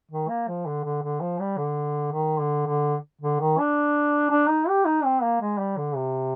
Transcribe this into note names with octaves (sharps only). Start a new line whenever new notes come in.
D#3
A#3
F3
D3
D3
D3
F3
G3
D3
D#3
D3
D3
D3
D#3
D4
D4
D#4
G4
D#4
C4
A#3
G#3
G3
D3
C3